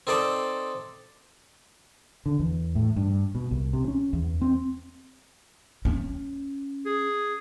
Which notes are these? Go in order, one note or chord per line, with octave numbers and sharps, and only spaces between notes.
C4 D#4 A4 C5 D5
D3
E2
A2
G2
B2
C2
C3
C#4
E2
C4
C#4
G#4